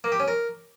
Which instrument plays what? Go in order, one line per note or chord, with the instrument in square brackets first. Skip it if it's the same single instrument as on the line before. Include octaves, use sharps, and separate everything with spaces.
[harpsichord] A#3
G4
C#4
A#4